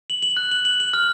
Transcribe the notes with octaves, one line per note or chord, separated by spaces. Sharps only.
F#7
F#7
F#6
F#7
F#7
F#7
F6